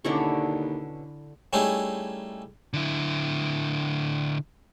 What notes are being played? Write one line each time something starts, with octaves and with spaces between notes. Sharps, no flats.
D#2 B2 D3 C#4 D4 E4 C#6
G3 A3 C#4 D#4 E4 G#4
D3 E4